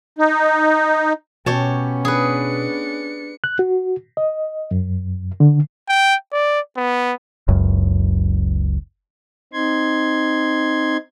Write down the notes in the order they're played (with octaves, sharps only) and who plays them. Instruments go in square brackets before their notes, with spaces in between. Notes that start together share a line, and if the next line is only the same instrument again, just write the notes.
[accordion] D#4
[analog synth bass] B2 [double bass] B3 C#4 [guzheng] G4 C#5 A5
[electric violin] D4 C#7 [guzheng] G#4 B4
[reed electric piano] F#6
F#4
D#5
F#2
D3
[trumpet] G5
D5
B3
[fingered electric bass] F#1 C#2 F#2
[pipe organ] C4 D#4 C6 G#6